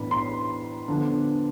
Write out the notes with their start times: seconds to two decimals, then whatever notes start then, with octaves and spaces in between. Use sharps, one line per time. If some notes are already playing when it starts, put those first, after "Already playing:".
Already playing: A2 E3 B3 D4 B5
0.11 C6
0.88 D3 F3 B3 D4